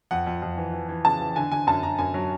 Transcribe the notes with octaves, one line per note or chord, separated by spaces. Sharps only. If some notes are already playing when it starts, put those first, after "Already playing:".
F2 F#5
F2
F2
E3
E3
E3
C#3 A5
E3
D3 G#5
D3 G#5
F#2 A5
F#2 A#5
F#2 G#5
F#3